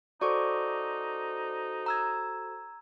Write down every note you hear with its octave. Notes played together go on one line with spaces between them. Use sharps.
D#4 F#4 A4 C5 D5 C#6 D6
A#5 E6 G#6